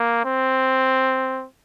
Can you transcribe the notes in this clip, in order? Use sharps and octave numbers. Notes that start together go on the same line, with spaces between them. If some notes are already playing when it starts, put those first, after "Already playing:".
Already playing: A#3
C4